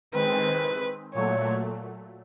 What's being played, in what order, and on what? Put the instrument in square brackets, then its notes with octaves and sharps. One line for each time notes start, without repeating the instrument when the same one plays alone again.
[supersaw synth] D#3 G#3 C4 [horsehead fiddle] B4
[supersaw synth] A#2 F#3 A3 [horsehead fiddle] C#5